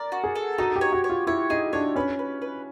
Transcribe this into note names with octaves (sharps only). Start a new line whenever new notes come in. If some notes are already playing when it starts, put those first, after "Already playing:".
Already playing: A#4 D5
F#4
G#4
A4
D#4 F#4
G4
C#5
F#4
C#5
F4
E4 C#5
D#4 G#4
D4 C#5
C#4 B4
B4
B4